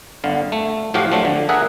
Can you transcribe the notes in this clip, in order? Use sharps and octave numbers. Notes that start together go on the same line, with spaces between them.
G1 D3 F5
A3
A2 F3 F#4 G4 F5
F3 F#3 A3 D4
D3
G#4 A#4 E5 F#5 G#5